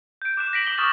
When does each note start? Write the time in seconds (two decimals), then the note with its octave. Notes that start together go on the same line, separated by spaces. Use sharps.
0.22 G6 D7
0.37 D6 F#6 E7
0.53 A#6 B6 D7 F#7
0.66 D6 B6 F#7 G7
0.78 C#6 D#6 F6 A6 E7 F#7